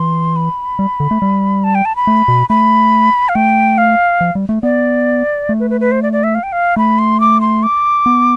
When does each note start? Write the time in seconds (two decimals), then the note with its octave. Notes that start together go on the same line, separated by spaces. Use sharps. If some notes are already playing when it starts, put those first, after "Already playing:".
Already playing: E3 C6
0.36 B5
0.79 G3
1.00 D3
1.11 A3
1.22 G3
1.64 A5
1.75 G5
1.85 A5
1.96 B5
2.07 A3
2.28 B2
2.49 A3 B5
3.29 F5
3.35 A3 G5
3.78 F5
4.21 F3
4.35 G3
4.49 A3
4.63 B3 D5
5.49 A3
5.60 B4
5.70 B4
5.81 B4
5.92 C5
6.02 D5
6.13 D5
6.24 E5
6.35 F5
6.43 G5
6.52 F5
6.77 A3 B5
6.99 C6
7.20 D6
7.41 C6
7.63 D6
8.06 B3